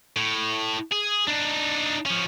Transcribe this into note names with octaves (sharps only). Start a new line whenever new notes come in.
A2
G#4
D4 D#4
F3 C#4